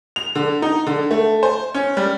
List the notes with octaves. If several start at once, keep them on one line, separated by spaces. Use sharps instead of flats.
F7
D3
D#4
D3
A3
C5
C#4
G3